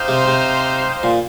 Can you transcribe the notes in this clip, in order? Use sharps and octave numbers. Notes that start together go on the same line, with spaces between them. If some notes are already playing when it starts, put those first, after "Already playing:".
Already playing: D#4 G4 C5 F5
C3
C3
A#2